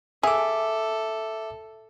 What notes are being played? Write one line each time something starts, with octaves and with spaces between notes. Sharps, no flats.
G#4 A4 E5 D6